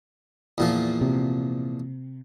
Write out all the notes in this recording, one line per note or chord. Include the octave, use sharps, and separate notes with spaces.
E2 A#2 F3
C3